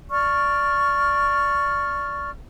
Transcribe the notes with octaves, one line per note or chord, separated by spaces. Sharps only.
D5 C#6 F6